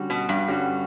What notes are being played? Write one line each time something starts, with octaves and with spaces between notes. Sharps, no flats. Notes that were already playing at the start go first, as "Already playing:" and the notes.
Already playing: D3 G3 C#4 F#4
B2
G2
D3 G3 C#4 F#4